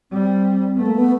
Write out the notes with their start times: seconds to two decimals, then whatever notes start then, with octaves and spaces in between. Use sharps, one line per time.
0.11 G3 C4
0.77 A3 B3
0.86 A#3
0.95 B3